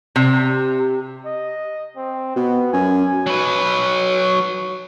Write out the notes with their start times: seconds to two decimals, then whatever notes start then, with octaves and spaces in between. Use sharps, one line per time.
0.16 C3
1.26 D#5
1.97 C4
2.36 B2 B3
2.73 F#2 G#5
3.27 F#3 B4